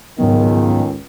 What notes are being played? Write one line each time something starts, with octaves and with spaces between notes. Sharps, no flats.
C#2 G#2 D#3 F#3 B3